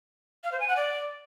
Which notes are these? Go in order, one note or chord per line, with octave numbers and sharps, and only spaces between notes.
F5
C5
G#5
F#5
D5